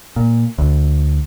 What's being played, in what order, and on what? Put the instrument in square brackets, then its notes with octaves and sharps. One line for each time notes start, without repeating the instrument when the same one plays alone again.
[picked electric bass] A#2
D2